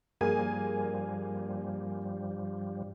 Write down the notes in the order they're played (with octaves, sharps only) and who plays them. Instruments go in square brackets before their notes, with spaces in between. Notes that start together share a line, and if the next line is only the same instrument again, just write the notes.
[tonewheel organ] G2 F3 G3 [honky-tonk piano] A#3 G#4 G#5